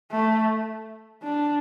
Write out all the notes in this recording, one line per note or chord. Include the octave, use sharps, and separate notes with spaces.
A3
D4